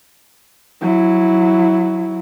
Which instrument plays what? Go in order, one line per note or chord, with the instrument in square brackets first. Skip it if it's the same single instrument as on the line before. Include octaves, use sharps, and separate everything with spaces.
[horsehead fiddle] F#3 E4